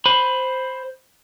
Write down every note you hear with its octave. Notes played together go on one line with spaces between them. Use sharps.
C5 B5